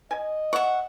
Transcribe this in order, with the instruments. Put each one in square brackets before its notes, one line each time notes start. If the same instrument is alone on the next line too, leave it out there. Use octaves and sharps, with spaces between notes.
[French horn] D#5 [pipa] G#5
[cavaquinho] E5 F#5 [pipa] C#6